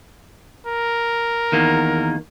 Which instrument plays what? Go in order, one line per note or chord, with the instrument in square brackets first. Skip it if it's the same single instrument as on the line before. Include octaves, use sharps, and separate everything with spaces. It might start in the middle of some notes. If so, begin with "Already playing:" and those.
[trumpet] A#4
[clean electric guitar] E2 D#3 A#3